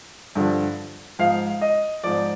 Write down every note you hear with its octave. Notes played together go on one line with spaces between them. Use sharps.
G2 D3 F3
G#2 F3 F5
D#5
G#2 F3 D5